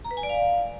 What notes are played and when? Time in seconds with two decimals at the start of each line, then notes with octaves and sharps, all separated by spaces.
0.05 A#5
0.11 B4
0.17 G#5
0.23 D5
0.30 F5